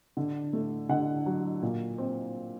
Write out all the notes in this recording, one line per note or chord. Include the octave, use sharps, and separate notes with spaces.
D3
A3
D3 F#5
F#3
A#2
C4